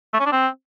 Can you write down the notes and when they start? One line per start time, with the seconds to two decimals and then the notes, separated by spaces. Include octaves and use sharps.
0.13 A3
0.20 C#4
0.26 D4
0.32 C4